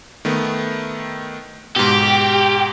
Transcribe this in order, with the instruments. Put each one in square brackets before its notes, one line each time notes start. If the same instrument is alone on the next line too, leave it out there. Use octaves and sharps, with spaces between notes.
[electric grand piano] D#3 A3 B3
[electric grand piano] G#2 B2 [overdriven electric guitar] G4